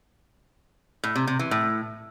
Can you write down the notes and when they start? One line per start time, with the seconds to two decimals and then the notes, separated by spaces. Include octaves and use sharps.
1.04 A2
1.16 C3
1.27 C3
1.39 E3
1.51 A2